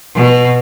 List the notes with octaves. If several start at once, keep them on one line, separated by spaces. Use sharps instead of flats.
B2